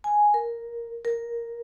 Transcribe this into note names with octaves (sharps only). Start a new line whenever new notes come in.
G#5
A#4
A#4